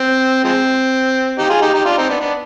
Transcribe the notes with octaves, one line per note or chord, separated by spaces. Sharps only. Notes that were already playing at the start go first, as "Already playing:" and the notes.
Already playing: C4
F3 G#3 C4
D#4 G4
F4 G#4
D#4 G4
D#4 G4
D4 F4
C4 D#4
B3 D4
B3 D4